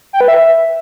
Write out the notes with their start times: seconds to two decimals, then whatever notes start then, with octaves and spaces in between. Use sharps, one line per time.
0.13 G5
0.21 B4
0.28 E5